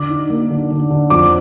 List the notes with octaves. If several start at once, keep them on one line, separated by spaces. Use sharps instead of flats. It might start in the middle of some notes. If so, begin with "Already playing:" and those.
Already playing: D3 D6
D#4
A#3
D3
D3
D3
F2 D6